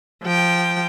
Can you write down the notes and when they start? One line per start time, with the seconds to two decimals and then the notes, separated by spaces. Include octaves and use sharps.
0.23 F3 G5